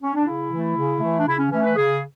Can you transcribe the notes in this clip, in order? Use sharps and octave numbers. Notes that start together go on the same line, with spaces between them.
C#4
D4
C#3 E4
E3 A3
C#3
E3 A3
D4
C#3 E4
C#4
E3 A3 C#4
B4
C#3 G#4